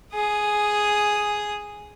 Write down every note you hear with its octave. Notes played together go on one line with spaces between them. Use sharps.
G#4 D#6